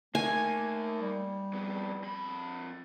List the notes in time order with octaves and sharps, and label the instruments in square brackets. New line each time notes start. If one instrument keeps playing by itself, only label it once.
[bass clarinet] A3 [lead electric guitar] A#3 D#4 [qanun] G#5
[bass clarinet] G3
[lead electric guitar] F2 B3
F2 B5